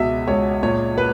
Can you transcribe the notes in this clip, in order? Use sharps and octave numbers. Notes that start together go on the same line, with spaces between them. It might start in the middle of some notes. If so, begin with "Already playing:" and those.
Already playing: C#2 B2 D#5 E5
C#2 C#5
A#2 C#5
B4